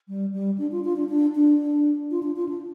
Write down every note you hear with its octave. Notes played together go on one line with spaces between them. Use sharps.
G3
G3
D4
F4
F4
D4
D4
D4
F4
D4
F4
D4